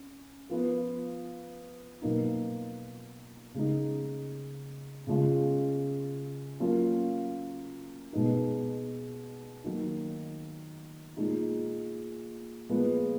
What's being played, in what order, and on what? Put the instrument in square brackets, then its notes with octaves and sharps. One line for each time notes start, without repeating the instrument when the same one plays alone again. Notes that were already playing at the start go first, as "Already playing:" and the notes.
Already playing: [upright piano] C#4
F3 B3 F4
B2 F#3 A#3 D#4
C#3 G#3 D#4
C#3 G#3 C#4 F4
F#3 A#3 C#4 F4
B2 G#3 B3 D#4
D#3 F#3 A#3 D#4
A#2 G#3 D#4
A#2 F3 G#3 B3